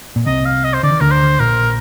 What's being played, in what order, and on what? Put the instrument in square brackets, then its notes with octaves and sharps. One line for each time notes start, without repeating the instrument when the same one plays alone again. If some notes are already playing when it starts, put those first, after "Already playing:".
[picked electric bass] A#2
[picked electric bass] C2 C3 [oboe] D#5
[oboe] F5
D#5
C5
[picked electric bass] D3 [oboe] D5
[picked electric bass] D#3
[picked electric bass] D2 D3 [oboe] A#4
[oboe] C5
[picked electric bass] A#1 A#2 [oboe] A#4